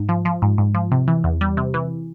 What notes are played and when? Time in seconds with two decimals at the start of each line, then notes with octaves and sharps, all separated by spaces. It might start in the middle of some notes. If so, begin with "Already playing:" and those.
Already playing: G#2
0.09 F3
0.25 F3
0.42 G#2
0.58 G#2
0.75 F3
0.92 C3
1.08 E3
1.24 E2
1.41 G3
1.57 C3
1.74 E3